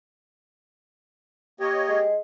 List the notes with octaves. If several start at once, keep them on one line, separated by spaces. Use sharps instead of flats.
A#3 G4 C#5 D#5
G#3